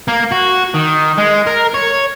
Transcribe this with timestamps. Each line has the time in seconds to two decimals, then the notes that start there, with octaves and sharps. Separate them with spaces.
0.08 A#3
0.32 F#4
0.75 D#3
1.18 G#3
1.47 A#4
1.74 C#5